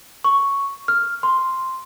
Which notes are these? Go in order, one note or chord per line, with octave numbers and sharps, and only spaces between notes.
C#6
F6
C6